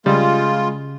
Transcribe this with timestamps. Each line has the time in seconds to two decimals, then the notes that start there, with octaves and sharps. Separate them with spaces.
0.06 C#3 G3 G#3 F4